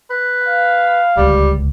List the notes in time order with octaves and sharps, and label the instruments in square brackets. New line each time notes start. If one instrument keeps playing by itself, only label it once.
[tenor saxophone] B4
[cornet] F5
[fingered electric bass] D1 C#2 [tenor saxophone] G3